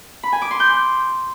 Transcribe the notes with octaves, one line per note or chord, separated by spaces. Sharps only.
B5
G#5
D6
C6
G6